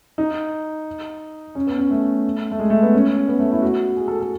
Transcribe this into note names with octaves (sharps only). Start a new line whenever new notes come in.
D#4
C#4
B3
C#4
A3
A3
G#3
A3
B3
C#4
B3
A3
E4
F#4
G#4
A4
A4